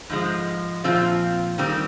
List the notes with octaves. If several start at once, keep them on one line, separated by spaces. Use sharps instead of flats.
G#2 F3 G#3
A#2 F3 C4 F4
D#3 G3 C4 G4